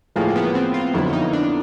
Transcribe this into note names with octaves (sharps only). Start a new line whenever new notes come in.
A2 F3 G#3 A#3
B3
C4
F4
F2 D3 F#3 E4
D#4
D4